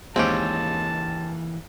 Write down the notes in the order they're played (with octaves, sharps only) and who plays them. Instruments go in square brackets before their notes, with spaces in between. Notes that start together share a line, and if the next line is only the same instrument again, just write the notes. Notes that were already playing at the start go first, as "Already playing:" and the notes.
[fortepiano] D#2 G#3 [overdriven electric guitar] E3 A#3 [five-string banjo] C4 C#4 G4 [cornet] A5